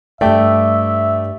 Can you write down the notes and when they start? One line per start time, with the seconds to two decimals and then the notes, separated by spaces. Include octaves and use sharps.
0.21 G2 A3 G4 D5 E5 G5